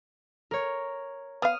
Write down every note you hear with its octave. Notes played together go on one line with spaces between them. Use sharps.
A#4 C#5
B3 F5 D#6 F6